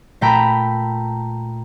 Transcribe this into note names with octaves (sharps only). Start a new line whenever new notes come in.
A#2 A3 G5 A#5 B5